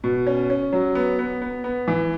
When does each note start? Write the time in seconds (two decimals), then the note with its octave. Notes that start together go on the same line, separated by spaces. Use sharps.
0.04 B2
0.27 C#4
0.50 C#4
0.73 F#3
0.95 B3
1.19 B3
1.42 B3
1.64 B3
1.88 E3